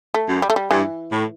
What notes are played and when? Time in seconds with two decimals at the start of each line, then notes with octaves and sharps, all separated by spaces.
0.14 A3
0.28 F#2
0.42 G3
0.50 A3
0.56 G3
0.70 G2 E3
1.12 A2